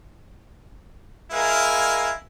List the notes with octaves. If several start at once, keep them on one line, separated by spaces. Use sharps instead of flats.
G#3 E4 A#4 F5 G#5